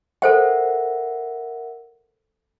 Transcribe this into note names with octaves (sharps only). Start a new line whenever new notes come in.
A4 A#4 C5 E5 F#5 G5